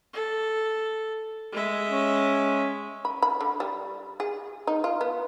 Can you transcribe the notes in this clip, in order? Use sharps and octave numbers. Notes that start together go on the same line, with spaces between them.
A4
G#3 E5
C#4
B5
B5
D3
G3
G#4
D#4
F4
B3